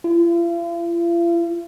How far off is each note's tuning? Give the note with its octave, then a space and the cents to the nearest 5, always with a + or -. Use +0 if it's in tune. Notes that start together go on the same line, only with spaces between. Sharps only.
F4 -45